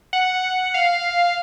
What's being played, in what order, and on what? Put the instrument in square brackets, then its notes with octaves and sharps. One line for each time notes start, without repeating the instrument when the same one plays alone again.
[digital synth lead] F#5
F5